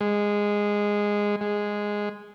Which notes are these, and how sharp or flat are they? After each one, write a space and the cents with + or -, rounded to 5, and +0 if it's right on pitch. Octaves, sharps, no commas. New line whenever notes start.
G#3 -10
G#3 -5